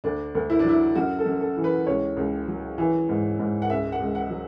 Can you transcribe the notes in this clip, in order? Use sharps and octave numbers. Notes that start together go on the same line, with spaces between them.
D2 D4
D2
E4
D4
F#3 E4
F#2 F#4
A4
F#2
A4
E3
B4
C#2 C#5
C#2
F#3
E3
G#2
G#2
F#5
C#2 E5
F#5
C#2
F#5
F#3